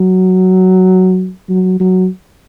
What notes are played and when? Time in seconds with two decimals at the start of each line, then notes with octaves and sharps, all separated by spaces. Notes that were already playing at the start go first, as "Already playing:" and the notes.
Already playing: F#3
1.49 F#3
1.80 F#3